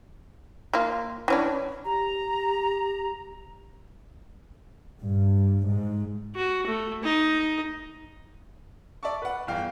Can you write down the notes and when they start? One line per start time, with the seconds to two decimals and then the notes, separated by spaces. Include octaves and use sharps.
0.74 A#3 F4
1.28 E3 C#4 D4
1.85 G4 A#5
5.00 G2
5.69 G#2
6.36 F#4
6.66 A3
7.03 D#4
9.03 D5 E5 A5 C#6
9.22 B4 F#5
9.47 G1 E2 F5 G5